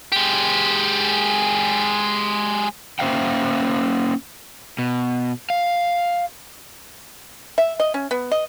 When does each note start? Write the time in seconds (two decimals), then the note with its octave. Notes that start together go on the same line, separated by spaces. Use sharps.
0.12 G#3 G4
2.99 A#3 C#4 C5 E5 F5 G5
4.79 B2
5.50 F5
7.58 E5
7.80 D#5
7.94 C#4
8.11 B3
8.31 D#5